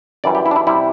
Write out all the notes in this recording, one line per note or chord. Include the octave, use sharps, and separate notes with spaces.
F#2 E3 G3 D5
G4
E4
D4
E4
C3 G3 E4